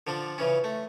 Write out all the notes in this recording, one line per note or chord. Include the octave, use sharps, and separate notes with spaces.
D3 F3 D4
C#3 E3 C#4
A3